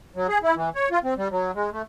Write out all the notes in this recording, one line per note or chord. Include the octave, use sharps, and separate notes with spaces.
F#3
G#4
E4
E3
C#5
F4
C4
G3
F#3
G#3
A3